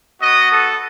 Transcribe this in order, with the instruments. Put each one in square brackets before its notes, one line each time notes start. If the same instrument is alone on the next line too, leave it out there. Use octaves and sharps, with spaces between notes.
[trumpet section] B3 F#4 D#5
A4